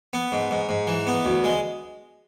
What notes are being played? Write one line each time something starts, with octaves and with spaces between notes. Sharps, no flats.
B3
G#2
G#2
G#2
E3
B3
D2
G#3